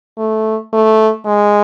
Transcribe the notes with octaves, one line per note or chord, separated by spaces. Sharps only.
A3
A3
G#3